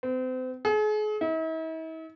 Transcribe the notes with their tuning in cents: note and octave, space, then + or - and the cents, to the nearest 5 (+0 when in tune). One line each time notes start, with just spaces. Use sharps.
C4 -35
G#4 +40
E4 -45